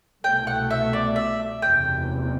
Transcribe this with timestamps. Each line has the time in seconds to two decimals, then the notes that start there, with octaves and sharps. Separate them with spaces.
0.24 C2 B2 A3 G5
0.47 F#5
0.71 E5
0.93 D5
1.16 E5
1.61 F#1 E2 C3 G5